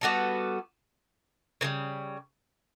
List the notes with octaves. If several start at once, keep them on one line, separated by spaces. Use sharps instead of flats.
G3 B3 F#4 A4
C#3 E3 G3